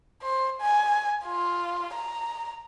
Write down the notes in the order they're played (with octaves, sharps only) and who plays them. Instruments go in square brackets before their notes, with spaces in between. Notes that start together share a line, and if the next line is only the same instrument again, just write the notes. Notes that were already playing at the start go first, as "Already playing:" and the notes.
[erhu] C5
G#5
F4
A#5